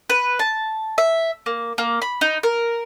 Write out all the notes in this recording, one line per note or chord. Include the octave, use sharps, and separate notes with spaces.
B4
A5
E5
A#3
A#3
B5
D#4
A#4